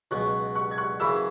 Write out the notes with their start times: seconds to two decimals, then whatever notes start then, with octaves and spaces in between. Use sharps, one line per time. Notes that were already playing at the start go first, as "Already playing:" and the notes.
0.11 C#2 B2 F#3 C#4 F#4 C#6 F#6
0.55 C#6 F#6
0.71 G#6
0.78 C#6 F#6
1.00 F#2 C#3 E3 C#4 B5 E6